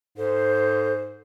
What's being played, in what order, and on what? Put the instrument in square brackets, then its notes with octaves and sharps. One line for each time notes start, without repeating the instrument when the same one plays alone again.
[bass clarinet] G#2 [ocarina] A4 [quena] C5